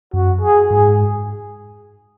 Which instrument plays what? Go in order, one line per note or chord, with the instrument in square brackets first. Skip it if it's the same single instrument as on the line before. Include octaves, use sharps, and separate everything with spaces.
[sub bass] F#2 [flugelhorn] F#4
[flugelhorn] G#4
[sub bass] G#2 [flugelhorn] G#4